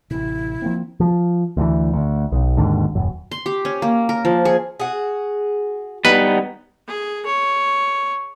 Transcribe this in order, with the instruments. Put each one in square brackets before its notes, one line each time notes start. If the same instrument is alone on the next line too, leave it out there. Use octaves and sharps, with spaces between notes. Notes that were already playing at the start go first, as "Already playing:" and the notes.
[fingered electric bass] A1 C3 [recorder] E4
[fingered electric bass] F3 A#3 C4
[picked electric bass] F3
D2 E3
D2
B1
G#1 D#2 G#2 D3
D#1 F#2
[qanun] C6
G4
C#4
A#3
A#4
F3
G#4
[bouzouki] F#4 G#4
[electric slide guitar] G3 B3 D#4 [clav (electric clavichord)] B4
[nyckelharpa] G#4
C#5